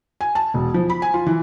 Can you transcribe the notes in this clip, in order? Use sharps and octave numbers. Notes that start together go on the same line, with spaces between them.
G#5
A5
E1
F3
B5
G#5
F4
E3